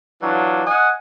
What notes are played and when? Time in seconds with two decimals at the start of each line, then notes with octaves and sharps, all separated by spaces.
0.20 E3 F#3 D4 F4
0.65 D#5 F#5 G#5